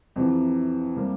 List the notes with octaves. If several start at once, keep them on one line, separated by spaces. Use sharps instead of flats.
F2 C3 E3
C3 G3 A#3